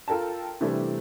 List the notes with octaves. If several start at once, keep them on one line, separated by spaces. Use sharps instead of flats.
F4 A4 A#4 G5 A5
C3 E3 G3 A3 C4 D4